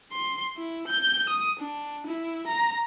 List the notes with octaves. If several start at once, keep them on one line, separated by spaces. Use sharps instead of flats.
C6
E4
G6
D#6
D4
E4
A#5